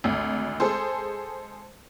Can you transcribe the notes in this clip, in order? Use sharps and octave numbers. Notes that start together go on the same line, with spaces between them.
G#1 D2
G#3 G#4 A4 C5